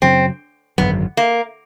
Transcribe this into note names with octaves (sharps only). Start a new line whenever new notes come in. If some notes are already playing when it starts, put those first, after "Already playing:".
F#2 C#3 F#3 C4
G#1 F#2 D3 F#3 B3
A#3